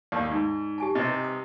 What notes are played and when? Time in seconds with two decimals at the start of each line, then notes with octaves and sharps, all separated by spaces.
0.12 D#2 D#3 D5
0.31 G#2 D#4
0.78 G4 G#5 A5
0.95 C3 D#4 B4 D#5
1.24 D#6